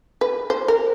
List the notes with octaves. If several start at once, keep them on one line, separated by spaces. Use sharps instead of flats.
B4
C5
A#4